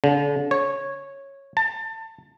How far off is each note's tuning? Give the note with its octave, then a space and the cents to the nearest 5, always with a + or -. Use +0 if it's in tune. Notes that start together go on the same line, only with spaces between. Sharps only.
D3 -40
C#5 -10
A5 +25